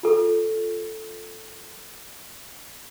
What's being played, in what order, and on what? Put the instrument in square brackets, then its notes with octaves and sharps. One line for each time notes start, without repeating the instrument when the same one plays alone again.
[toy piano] F4 A4